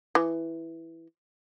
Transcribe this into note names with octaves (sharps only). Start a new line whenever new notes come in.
E3